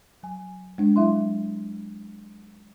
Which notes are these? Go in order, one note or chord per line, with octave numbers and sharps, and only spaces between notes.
F#3 G#5
G#3 D4
F#3 E4 E5 F5 C6